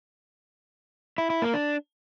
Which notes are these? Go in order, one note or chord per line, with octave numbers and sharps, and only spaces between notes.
E4
E4
A#3
D4